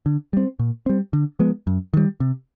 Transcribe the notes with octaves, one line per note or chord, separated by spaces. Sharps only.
D3
G3 C4
A#2
G3 C4
D3
F3 G#3 B3
F#2
D#3 G3
C3